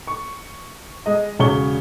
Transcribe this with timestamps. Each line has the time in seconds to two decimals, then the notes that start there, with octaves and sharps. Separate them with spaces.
0.07 C#6
1.06 G#3 D#5
1.39 E1 C#3 C#5 C#6 G7